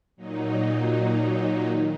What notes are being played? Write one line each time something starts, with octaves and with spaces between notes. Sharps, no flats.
A#2 F#3 D#4
D#3